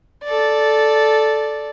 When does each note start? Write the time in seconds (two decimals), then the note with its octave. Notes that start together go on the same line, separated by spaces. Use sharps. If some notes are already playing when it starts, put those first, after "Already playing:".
0.24 A4 D5